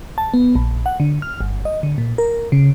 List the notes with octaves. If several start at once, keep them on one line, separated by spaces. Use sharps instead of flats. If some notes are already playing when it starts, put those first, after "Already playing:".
A5
B3
A#1
F#5
D3
F6
G1
D#5
D3
A#2
A#4
C#3